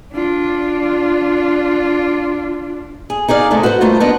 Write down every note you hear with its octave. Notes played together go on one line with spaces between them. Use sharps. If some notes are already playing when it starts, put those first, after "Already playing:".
D4 F4
G#4
D#4 G#4 D5 F5
C3 G#3 A3 A4 D#5
F#4 B4 C5 E5 F#5
G3 A3 A#3 D#4 F4 C5
B3 D4 D#5